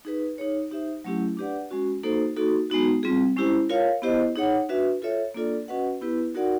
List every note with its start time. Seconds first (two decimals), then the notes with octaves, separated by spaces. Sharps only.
0.05 D#4 G#4 B4
0.38 D#4 G#4 C#5
0.71 D#4 G4 C5 E5
1.04 F#3 A3 C#4 E4 G4
1.37 D4 G4 B4 D5 F#5
1.71 G#3 C#4 F#4
2.03 A#3 D#4 F#4 A4 C5
2.36 A#3 D#4 F#4 A4
2.70 G#3 B3 D#4 F#4
3.03 G3 C4 F4 G#4
3.36 G#3 C#4 E4 G4 C5
3.69 F4 A#4 C#5 F5
4.02 B3 E4 G4 C5 D#5
4.36 D#4 G#4 C#5 F#5
4.69 D4 F#4 B4 E5
5.02 F4 A4 C#5 E5
5.35 A#3 D4 F4 A4 D5
5.68 C#4 F#4 B4 D#5 F#5
6.01 B3 E4 G4 B4
6.35 D#4 F#4 A#4 D5 F#5